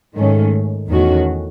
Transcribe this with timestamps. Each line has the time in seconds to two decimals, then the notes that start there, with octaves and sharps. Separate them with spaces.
0.16 G#2 D#3 A3 C#4
0.89 E2 D#3 A3 C#4 F#4